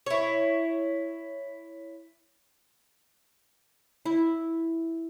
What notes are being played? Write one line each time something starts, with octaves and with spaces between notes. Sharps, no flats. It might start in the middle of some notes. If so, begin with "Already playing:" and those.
E4 C#5
E4